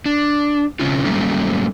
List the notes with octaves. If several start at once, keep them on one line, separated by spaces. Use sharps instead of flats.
D4
C#3 C4 C#4 E4 F4
F#3 G3 A3 A#3 C#4